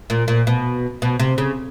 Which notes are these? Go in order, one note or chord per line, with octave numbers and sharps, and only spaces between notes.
A#2
A#2
B2
B2
C3
C#3